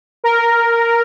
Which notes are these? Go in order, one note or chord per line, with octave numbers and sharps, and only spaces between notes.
A#4